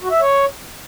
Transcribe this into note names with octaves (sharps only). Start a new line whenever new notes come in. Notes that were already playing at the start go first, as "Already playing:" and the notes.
F#4
E5
C#5